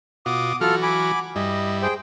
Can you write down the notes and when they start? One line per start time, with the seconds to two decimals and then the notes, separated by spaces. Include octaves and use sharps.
0.26 B2 F4 F#4 D6 D#6
0.61 E3 F#3 F4 F#4 A4 F6
0.82 G#5 B5 D6
1.36 G2 G3 E4 D#5
1.82 G#4 C5 G5